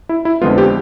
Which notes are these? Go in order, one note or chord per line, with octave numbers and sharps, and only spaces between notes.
E4
E4
F2 D3 F3 G#3 B3 F4
G4